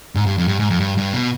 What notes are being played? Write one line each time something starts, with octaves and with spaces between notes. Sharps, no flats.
G#2
G2
F2
G2
G#2
F2
G2
G2
B2